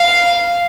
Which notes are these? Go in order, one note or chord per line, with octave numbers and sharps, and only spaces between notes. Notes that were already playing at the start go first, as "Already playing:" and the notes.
Already playing: F5